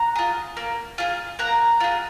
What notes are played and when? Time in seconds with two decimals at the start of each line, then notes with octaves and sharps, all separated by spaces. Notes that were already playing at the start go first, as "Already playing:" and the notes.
Already playing: F#5 A#5
0.16 F4 G#4
0.57 A#3
0.98 F4 G#4
1.39 A#3 F#5 A#5
1.80 F4 G#4